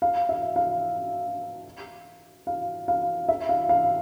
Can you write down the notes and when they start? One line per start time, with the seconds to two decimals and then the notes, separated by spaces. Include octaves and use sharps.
0.02 F5
0.29 E5
0.56 F5
2.47 F5
2.88 F5
3.29 E5
3.49 F5
3.69 F5